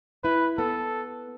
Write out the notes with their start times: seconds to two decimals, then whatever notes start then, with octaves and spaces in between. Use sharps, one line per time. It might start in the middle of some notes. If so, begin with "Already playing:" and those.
0.24 E4 B4
0.58 B3 A4